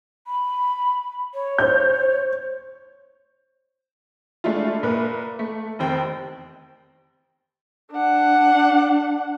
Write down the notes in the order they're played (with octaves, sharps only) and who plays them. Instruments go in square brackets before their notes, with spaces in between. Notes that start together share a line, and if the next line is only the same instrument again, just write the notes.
[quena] B5
C#5
[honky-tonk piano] C5 G6
G#3 A3 D4 E4 F4
A#2 A#4 B4
A3
F1 D#3 C4 G5
[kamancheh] D4 F#5